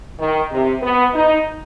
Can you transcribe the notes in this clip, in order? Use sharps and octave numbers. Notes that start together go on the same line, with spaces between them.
D#3
C3
B3
D#4